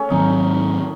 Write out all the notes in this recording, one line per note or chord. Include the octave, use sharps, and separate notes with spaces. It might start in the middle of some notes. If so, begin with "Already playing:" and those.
Already playing: A3 C#4
G#2 D#3 F#3 C4 D#4